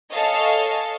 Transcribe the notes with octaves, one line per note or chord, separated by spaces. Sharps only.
A4 C#5 D#5 F5 G#5 A5